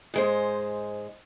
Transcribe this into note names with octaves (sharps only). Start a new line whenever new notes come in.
G#2 G#3 C5